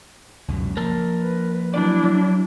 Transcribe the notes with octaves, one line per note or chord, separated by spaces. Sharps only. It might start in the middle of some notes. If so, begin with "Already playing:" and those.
C#2 F#2 B2
F3 A#3 A#4 A5
B4
F#3 D4 E4 D5
F#3